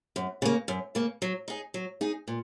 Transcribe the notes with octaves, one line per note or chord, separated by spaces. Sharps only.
F#2
C#3 A#3
F#2
C#3 A#3
F#3
D#4 G#4
F#3
D#4 G#4
A#2